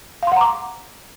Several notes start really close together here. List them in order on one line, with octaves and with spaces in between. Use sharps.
F5 C6 F#5 A#5 D6